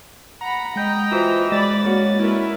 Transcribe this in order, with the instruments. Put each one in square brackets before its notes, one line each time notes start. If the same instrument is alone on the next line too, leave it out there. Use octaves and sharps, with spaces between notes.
[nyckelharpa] F#5 B5 [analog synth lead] A#5
[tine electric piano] G#3 G6 [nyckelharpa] D#5 G5
[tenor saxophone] E3 [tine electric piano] F4 F#4 C5
[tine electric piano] G#3 [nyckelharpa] D5 B5 [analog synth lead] A6
[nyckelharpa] A#3 F#4 [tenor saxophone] C#4
[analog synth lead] E4 [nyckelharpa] A#4 B4